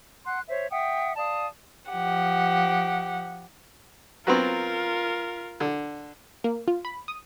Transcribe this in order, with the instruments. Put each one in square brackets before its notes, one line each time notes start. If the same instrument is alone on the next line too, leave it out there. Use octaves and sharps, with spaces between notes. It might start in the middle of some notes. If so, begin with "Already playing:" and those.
[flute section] F#5 C6 F#6
C5 C#5 E5
E5 F#5 G5 D#6
D5 F5 A5 D#6
[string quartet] F3 G4 F#5
[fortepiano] F#3 B3 C4 [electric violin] F4 A#4
[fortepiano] D3
[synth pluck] A#3
F4
B5
D#6